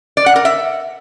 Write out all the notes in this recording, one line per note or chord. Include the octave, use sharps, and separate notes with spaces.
D5
F#5
A#4
E5